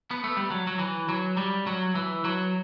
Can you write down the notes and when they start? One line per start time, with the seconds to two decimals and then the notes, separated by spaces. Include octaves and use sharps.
0.11 B3
0.24 A3
0.37 G3
0.51 F#3
0.67 F#3
0.79 E3
1.09 F#3
1.37 G3
1.67 F#3
1.95 E3
2.25 F#3